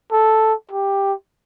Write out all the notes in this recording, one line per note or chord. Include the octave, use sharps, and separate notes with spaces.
A4
G4